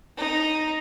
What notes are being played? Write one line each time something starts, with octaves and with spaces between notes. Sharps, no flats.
D#4